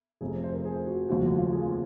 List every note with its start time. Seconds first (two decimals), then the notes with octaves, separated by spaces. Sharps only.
0.21 F1 F2 C3 G#4
0.44 C5
0.54 A#4
0.65 G#4
0.87 F#4
1.09 F1 D#2 C#3 F3 G#3 F#4
1.23 F#4
1.38 F4
1.53 G#4